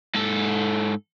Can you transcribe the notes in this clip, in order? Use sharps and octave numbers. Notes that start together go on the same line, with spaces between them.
G#2 A4